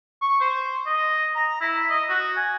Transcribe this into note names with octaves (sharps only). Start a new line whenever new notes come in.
C#6
C5
D#5
A#5
E4
D#5
F#4
G#5